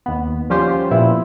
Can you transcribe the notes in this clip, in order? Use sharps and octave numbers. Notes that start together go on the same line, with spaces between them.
D#2 B3
F3 G3 C#4 F4 G4 C5
A#2 B3 E4